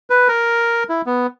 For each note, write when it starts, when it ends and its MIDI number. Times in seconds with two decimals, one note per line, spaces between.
0.10 0.28 71
0.28 0.83 70
0.89 1.02 64
1.06 1.27 59